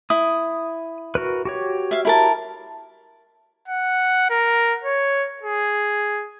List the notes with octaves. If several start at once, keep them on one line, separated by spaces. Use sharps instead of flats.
E4 D#6
F#4 A#4 B4
F#4 G4 C#5
E5 F5
E4 A#4 A5
F#5
A#4
C#5
G#4